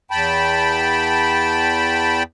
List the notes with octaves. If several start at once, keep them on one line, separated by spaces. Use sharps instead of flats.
E2 G5 A5 B5